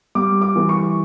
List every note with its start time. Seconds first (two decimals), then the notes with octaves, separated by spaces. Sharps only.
0.15 G3 D6
0.42 D6
0.56 E3
0.69 C#6